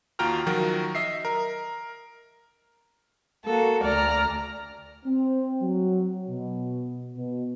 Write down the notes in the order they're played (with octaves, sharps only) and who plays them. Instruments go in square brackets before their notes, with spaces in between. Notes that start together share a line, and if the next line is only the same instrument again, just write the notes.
[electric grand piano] D#2 F4 F#4 G5 A#5 F6
D#3 F3 F#3 F#4 A#4
D#5 E5 C7
A#4
[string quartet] A#3 F#4 [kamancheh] A4
[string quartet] D2 A#5 F6 [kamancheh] D5
[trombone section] C4
F#3
B2
B2